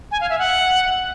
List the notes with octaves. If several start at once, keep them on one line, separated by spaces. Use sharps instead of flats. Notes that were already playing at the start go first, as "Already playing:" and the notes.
G#5
F5
E5
F#5